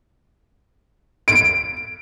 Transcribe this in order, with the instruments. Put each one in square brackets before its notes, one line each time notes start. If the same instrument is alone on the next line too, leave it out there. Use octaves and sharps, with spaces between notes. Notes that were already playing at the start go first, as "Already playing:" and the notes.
[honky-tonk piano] D7